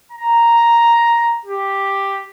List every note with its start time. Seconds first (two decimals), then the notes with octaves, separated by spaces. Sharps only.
0.12 A#5
1.45 G4